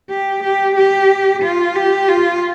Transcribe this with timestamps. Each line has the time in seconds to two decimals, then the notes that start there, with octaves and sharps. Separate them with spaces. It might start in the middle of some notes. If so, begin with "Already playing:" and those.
0.10 G4
0.44 G4
0.76 G4
1.44 F4
1.76 G4
2.09 F4